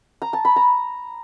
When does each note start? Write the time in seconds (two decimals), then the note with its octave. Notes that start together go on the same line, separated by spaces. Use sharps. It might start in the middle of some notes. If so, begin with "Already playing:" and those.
0.22 A#5
0.33 A5
0.45 B5
0.56 A#5